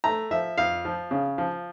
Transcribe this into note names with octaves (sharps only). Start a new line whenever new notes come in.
A3 A#5
F3 E5
F2 F5
F3
C#3
F3